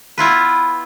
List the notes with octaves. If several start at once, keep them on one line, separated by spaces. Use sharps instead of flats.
B3 E4 F4 B4